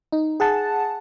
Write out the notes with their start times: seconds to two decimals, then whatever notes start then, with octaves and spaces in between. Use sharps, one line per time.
0.12 D#4
0.40 G#4 F#5 A5